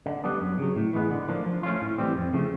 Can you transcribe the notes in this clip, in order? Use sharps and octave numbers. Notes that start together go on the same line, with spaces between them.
D3
G3 B3 D4
F#2
C#3 F#3
A2
E3 G#3 B3
D3
F3 A#3 D4
F3
A3 C#4 F4
A2
E3 G3 C4
F2
C#3 F3 A3